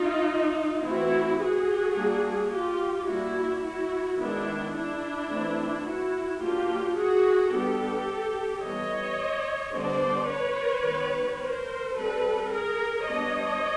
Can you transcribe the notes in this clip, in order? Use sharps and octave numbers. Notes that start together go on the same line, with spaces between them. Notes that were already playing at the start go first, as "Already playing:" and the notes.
Already playing: D#4 F4
E3 A3 C4 E4 F#4
F#4 G#4
G3 A#3 D4
F4 G4
G3 A#3 D4 E4 F#4
E4 F#4
D#3 G#3 B3 D4 E4
D4 E4
E3 A3 C4
E4 F#4
F#3 A#3 D4 F4 G4
F#4 G#4
G3 B3 D4 G4 A4
E3 G3 B3 C#5 D#5
D3 G3 B3 D4 C5 D5
B4 C#5
D#3 G3 B3
A#4 C5
G3 C4 A4 B4
G#4 A#4
G3 B3 D4 C#5 D#5